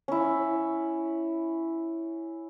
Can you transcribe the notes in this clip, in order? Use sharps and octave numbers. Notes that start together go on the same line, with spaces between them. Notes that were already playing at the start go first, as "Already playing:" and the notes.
C#4 E4